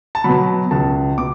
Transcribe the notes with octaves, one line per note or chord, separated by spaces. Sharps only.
A5
B2 F#3 B5
C#2 A5
B2 D6